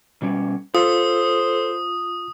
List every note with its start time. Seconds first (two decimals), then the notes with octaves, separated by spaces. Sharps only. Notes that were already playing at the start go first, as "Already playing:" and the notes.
0.22 B2 G3 C#4
0.75 F4 A4 C5 D#6